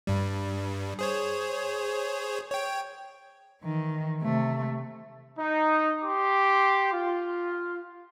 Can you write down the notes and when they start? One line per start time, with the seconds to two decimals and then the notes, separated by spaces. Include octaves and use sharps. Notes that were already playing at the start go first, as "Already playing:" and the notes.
0.07 G2 G3
0.99 G#4 C5 C#5
2.51 C#5 G5
3.62 D#3 E3
4.22 C3 A3
5.39 D#4
6.03 G4 C6 D6
6.94 F4